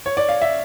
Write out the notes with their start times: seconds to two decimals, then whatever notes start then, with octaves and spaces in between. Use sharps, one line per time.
0.06 C#5
0.17 D5
0.29 F5
0.42 E5